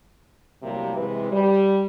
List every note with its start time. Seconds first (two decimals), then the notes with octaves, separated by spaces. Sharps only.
0.63 A2 C3 F#3 G3 A#3
0.94 C3 E3 G#3 B4
1.31 G3